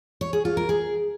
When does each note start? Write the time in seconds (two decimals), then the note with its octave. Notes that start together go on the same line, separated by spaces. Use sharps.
0.21 C#5
0.33 G#4
0.45 F4
0.57 A#4
0.69 G#4